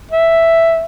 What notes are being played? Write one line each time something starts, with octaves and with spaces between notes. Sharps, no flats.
E5